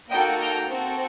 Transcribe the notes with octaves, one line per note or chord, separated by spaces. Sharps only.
A#3 D#4 F#4 A4 D#5 G5
G5 A#5
C4 F#4 A4